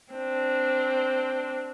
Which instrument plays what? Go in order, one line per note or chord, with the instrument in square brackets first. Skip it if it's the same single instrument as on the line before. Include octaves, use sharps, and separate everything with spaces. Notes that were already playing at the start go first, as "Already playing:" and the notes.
[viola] C4 D4